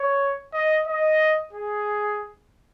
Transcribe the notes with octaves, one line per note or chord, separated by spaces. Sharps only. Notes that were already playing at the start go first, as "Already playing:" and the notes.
Already playing: C#5
D#5
D#5
G#4